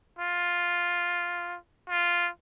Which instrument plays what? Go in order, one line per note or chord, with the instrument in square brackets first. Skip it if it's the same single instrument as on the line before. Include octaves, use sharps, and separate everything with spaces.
[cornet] F4
F4